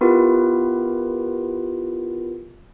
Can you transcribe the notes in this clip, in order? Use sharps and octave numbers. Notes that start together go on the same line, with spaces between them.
B3 E4 F4 G4 A#4 B4